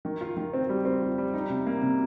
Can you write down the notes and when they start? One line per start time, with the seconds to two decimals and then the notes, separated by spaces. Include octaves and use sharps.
0.05 D#3
0.21 F4
0.37 D#3
0.53 C4
0.69 G3
0.85 C4
1.01 F4
1.18 G3
1.34 D#4
1.50 C3
1.66 A#3
1.82 C3